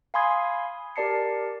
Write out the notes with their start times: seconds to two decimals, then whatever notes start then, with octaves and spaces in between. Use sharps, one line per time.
0.14 F5 G#5 B5 C6 D#6 G#6
0.96 G4 A#4 D5 A5 C7 C#7